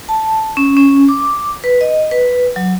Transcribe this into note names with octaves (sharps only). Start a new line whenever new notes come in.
A5
C#4
C#4
D6
B4
D#5
B4
F#3